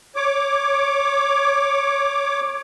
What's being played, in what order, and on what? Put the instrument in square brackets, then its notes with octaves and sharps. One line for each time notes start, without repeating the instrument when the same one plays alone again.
[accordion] C#5 D6